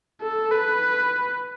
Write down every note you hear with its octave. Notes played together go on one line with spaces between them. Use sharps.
A4
B4